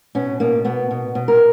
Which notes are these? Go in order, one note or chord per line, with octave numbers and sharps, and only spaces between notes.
B2 C#4
B2 A#3
B2 B3
B2
B2
A#4